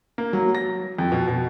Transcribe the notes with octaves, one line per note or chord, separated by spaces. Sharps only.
A#3
F#3
A#6
F2
B2
B2